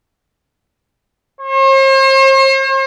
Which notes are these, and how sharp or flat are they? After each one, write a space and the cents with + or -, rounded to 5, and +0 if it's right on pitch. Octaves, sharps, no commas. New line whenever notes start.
C5 +45